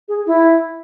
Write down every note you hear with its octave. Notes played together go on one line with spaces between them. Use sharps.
G#4
E4